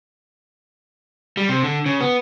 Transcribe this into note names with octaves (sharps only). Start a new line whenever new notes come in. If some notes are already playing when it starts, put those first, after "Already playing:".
G3
C3
D3
C#3
B3